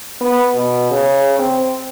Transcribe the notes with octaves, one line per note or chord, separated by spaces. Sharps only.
B3
B2
C#3
C4